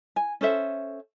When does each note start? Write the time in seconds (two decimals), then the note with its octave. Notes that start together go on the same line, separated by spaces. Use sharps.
0.16 G#5
0.41 C#4 A4 C5 E5